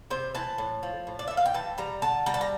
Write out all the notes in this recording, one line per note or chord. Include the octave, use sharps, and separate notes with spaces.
C3 C5
E3 A5
A2
F3
A2
D5
E3 E5
F5
G5
E3 A5
G3 A#5
D3 A5
G3 A#5
A5
A#5